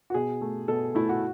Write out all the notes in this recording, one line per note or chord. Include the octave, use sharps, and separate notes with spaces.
F#4
B2 G#4
A3
B2 A4
A3 E4
F#4